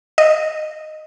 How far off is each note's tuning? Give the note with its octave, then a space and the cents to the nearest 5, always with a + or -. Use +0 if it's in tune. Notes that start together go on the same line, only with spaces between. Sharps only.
D#5 -10